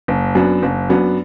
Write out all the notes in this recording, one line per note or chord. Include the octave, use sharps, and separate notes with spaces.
F#1
F#2 F#3 B3 D4
F#1
F#2 F#3 B3 D4